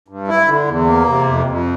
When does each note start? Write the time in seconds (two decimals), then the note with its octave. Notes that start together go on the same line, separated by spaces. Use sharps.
0.08 G2
0.28 E4
0.48 D3
0.67 E2
0.87 A#3
1.07 C3
1.27 F2
1.46 F2